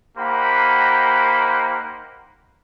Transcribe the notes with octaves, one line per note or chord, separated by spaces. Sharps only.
A#3 D#4 G4 C5 F#5 B5